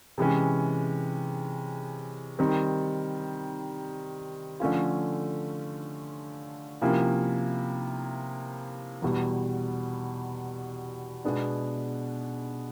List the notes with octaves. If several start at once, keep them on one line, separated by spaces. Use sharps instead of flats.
C3 E3 G#3 C#4
D#3 G3 C4
D3 F3 A3 C#4 F4
C3 F3 A#3 C#4 E4
E2 B2 G3
B2 G#3 B3 D4